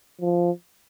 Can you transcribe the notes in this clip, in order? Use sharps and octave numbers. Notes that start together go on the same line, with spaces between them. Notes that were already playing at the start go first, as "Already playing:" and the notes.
F3